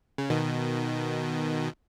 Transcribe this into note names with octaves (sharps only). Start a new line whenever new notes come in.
C#3
B2 D#3